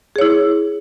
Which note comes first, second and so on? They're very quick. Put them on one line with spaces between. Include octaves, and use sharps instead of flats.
G#4 C#5 E4